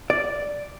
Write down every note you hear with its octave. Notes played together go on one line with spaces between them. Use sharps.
D5